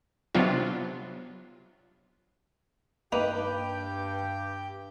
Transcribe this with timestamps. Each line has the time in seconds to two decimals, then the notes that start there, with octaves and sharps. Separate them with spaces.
0.35 C3 F#3 B3 D4 F4
3.12 G2 A#3 D#4 G4 B4 G5